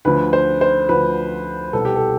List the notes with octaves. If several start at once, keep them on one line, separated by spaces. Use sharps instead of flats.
D2 D3 F3 B4
C5
C5
D2 D3 F3 B4
C2 B2 A4
G4
A4